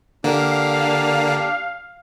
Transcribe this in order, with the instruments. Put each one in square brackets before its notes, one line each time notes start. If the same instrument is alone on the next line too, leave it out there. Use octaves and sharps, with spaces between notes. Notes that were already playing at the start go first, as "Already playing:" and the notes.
[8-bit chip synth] D3 A#3 [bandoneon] D4 G4 [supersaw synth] F5